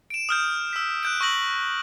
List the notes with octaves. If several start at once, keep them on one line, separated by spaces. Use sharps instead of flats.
D7 E7
D#6 F6 G6
E6 B6
F#6 G6 D7
C#6 E6 A#6 F#7